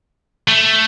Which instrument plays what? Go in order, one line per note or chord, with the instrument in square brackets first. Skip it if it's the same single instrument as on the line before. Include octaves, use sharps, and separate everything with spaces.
[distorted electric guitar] A3